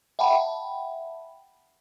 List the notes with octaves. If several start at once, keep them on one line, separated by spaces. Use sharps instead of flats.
E5 F#5 G5 A5 B5